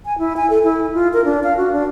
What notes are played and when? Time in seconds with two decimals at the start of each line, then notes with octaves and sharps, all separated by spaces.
0.05 G#5
0.19 E4
0.37 G#5
0.50 A4
0.64 E4
0.94 F4
1.13 A#4
1.25 D4
1.44 F5
1.57 F#4
1.73 D4